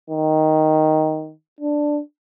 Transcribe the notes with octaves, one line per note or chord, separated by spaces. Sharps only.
D#3
D4